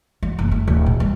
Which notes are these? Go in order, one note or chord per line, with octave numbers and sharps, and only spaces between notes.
F#2
F#1
A3
D1
A#2
G3